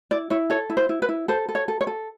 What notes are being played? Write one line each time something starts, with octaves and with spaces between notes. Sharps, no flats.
E4 D5
E4 C#5
A4 C#5
E4
C5
E4
B4
E4
A4 C5
A4
C#5
A4
C#5
A4